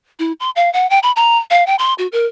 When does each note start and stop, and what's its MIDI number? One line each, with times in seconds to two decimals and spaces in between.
0.19 0.32 64
0.40 0.50 84
0.56 0.72 77
0.73 0.89 78
0.90 0.99 79
1.03 1.11 83
1.16 1.38 82
1.50 1.64 77
1.67 1.75 79
1.79 1.94 84
1.98 2.07 66
2.12 2.26 70